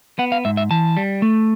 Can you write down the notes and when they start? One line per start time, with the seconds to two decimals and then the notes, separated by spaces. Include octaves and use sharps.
0.19 B3 F#5
0.32 F5
0.45 G#2 E5
0.57 E5
0.71 E3 A5
0.97 G3
1.22 A3